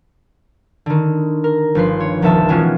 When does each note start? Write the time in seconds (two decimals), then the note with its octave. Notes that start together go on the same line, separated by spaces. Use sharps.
0.86 D3 D#3
1.44 A#4
1.75 G1 F3 B4 C6
2.00 C#5
2.22 C2 D#3 F3 B3 E5 A5
2.49 B2 E3 G#3 C#4 F4 F#4